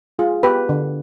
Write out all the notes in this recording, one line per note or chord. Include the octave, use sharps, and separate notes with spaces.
G#3 F4 G#4
B3 G4 B4
D3